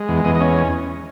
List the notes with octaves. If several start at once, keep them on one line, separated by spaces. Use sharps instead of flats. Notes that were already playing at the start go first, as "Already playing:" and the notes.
Already playing: G#3
E2
E2 D#5
D#5
C#4